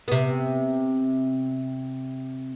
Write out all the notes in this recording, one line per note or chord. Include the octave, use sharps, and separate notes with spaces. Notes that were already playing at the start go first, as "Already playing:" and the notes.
C3 B3